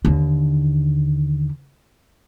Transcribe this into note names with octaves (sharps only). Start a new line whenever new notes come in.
D#2 D3